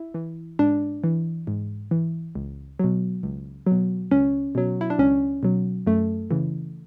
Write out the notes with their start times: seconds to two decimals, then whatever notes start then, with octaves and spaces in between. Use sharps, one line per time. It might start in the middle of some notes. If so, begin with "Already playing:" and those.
Already playing: E4
0.14 E3
0.59 G#2 D4
1.04 E3
1.47 G#2
1.91 E3
2.35 C#2
2.80 B2 F#3
3.23 C#2
3.67 B2 F#3
4.11 C#2 C#4
4.55 B2 F#3
4.81 E4
4.90 D4
4.98 C#2 C#4
5.43 B2 F#3
5.87 F#2 A3
6.31 C#3 E3